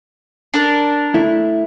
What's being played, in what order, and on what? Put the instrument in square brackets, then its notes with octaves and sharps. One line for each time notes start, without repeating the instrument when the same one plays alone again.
[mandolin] D4 A#4
[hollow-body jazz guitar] A3 E4